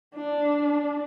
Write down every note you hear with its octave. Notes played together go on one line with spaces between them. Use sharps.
D4